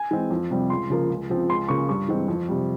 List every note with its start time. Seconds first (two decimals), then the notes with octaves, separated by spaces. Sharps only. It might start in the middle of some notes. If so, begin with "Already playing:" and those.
Already playing: G#5
0.11 E3 G#3 C4
0.30 F2
0.51 C3 G3 C4
0.70 C#2 C6
0.90 C#3 F3 A#3
1.10 C#2
1.30 C#3 F3 C4
1.49 C#2 C6
1.68 C#3 F3 A#3 C#6
1.89 G2 C#6
2.08 E3 G#3 C4
2.28 F2
2.48 C3 G3